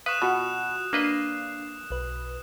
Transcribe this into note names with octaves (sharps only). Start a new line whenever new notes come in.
B4 F5 C#6 D#6 F#6 E7
B2 F4 F#4 F#5
A#3 D4 B4 D#5 F5 C7
B1 B4